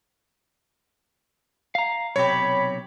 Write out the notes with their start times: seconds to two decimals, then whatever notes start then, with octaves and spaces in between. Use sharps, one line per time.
1.75 F5 A#5
2.16 B1 C3 G4 C#5 B5